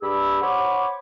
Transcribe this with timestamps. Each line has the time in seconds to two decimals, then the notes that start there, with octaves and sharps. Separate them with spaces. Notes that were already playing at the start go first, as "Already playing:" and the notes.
0.02 G2 G4 G#4 B5 E6
0.42 C5 C#5 F#5 B5 C#6 D6